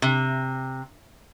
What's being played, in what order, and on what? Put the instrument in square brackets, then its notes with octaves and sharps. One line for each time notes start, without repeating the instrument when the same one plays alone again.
[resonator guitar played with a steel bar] C3